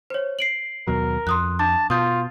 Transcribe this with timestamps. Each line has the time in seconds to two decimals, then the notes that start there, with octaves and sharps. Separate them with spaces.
0.10 C5 C#5
0.39 C7 D7 F#7
0.87 D#2 B2 F#3 A#4
1.27 F2 C6 D#6 F#6
1.59 D4 A5 D6
1.90 B2 F4 D#6 G6